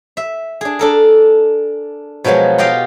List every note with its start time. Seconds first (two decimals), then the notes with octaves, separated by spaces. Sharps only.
0.17 E5
0.61 D4 G#4
0.79 D4 A4 A#4
2.24 B2 F3 F#3 G#3 B3
2.58 F4 G4 D#5 F5 G5